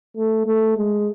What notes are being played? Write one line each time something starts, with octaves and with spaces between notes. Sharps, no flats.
A3
A3
G#3